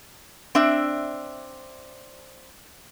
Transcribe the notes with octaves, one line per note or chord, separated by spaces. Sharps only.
C4 D4 E5